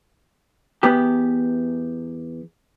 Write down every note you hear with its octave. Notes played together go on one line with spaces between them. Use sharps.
E2 B3 G4